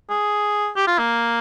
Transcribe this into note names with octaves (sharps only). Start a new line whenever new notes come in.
G#4
G4
F4
A#3